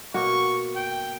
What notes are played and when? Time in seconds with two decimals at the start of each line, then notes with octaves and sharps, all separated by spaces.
0.14 B2 A#3 F#4 C#6
0.75 G5